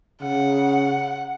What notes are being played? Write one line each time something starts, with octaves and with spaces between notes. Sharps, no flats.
C#3 F#5